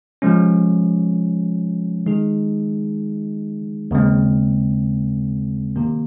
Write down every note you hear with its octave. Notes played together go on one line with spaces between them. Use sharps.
C3 F3 G#3 C#4
D#3 G#3 D#4 G#4
D#2 C#3 G#3 C4
C3 D#3 A#3